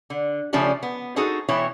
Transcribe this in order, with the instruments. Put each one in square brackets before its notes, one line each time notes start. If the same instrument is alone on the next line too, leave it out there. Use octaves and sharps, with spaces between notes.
[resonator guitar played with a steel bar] D3
C#3 F3 A3 C#4 D4 G4
B3
D#4 F#4 G#4 A4 C5
B2 E3 E4 C#5 G5